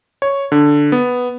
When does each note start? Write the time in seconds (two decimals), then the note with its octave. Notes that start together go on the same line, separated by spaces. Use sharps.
0.22 C#5
0.52 D3
0.92 B3